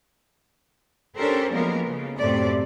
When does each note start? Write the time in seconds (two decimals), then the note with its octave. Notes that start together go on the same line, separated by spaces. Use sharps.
1.16 C#4 D4 G4 A4 A#4 C5
1.52 F3 F#3 G#3 A#3 B3 A#4
1.87 C#3
2.17 F#2 A2 C3 A3 D5